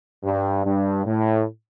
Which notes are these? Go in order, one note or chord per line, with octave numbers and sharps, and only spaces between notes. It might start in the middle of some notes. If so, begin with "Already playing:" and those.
G2
G2
A2